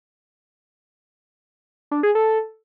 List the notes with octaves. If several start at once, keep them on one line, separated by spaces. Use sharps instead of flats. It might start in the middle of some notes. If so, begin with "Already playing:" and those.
D4
G#4
A4